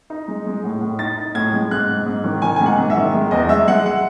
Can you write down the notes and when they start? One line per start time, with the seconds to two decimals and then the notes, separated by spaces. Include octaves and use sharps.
0.10 D#4
0.28 G#3
0.46 G#3
0.64 A2
0.81 A2
0.99 D#4 A6
1.18 D#4
1.35 A2 G#6
1.53 G#3
1.71 G#2 F#6
1.89 G#2
2.06 G#2
2.24 D#3
2.42 D#3 G#5
2.56 G#2 G#5
2.66 F#5
2.78 G#2
2.90 E5
2.96 D#3
3.14 G#3
3.31 E2 D#5
3.49 G#3 E5
3.68 G#3 F#5
3.86 F#5